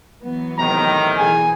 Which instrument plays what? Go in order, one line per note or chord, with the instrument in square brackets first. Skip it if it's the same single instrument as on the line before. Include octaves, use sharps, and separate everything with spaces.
[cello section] E3 F#3 B3
[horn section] A2 C3 D#3 [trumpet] A#5
[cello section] B2 E3 G#4 [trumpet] G#5